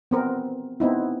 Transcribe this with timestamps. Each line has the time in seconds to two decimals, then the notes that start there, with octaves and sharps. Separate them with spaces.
0.11 B3 C4 A#4
0.80 B3 C4 D#4 E4